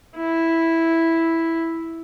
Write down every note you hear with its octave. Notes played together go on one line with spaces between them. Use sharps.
E4